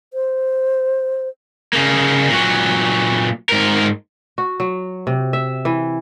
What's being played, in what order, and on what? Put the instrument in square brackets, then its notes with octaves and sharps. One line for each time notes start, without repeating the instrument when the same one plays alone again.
[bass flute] C5
[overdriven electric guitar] C#3 A#3
A#2 F#3
G#2 A#4
[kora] F#4
F#3
C3
E5
E3